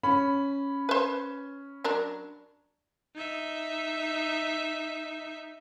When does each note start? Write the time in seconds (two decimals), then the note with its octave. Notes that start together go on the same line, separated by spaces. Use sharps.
0.03 C#4 B5
0.89 B4 C5
1.84 F#3 D4 A#4
3.15 D#4 E5